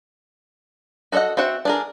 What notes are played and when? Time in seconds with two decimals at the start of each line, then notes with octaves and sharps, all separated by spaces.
1.12 F#4 A4 C#5 D#5 F#5
1.37 C4 F#4 E5 F#5
1.65 D4 G#4 A#4